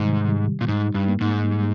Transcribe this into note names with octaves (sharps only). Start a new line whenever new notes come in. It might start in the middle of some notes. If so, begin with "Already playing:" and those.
Already playing: G#2 C3 D#3 G3
G3
A#2
G#2 D#4
G2
A#3
G#2
G3